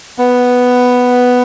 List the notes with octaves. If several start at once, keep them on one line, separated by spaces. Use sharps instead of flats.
B3